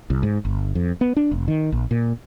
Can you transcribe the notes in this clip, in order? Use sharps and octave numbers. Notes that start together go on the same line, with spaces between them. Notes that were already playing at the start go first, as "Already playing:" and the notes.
C2
G#2
G1
F2
B3
D4
F1
D#3
A#1
A#2